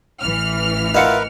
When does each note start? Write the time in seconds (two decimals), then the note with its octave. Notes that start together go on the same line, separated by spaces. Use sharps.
0.21 A1 E3 F6
0.94 E4 F4 A#4 B4 D#5 F#5 C#7